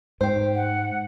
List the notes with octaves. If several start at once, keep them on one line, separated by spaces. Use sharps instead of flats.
G#2 G4 C5
F#5